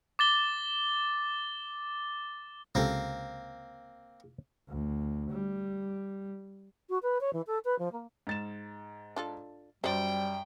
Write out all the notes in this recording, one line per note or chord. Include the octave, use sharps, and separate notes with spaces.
D6 A6 G7
C#2 C3 A#3 C4 A4
D2
G3
F#4
B4
C#5
E3
A4
B4
F3
A#3
G#2 A6 E7
D4 F4 A4
F#2 G3 C5 D5 G5